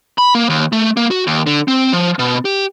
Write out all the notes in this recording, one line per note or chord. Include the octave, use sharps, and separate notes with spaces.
B5
A#3
D#2
A3
A#3
F#4
D#2
D3
C4
F3
B2
G4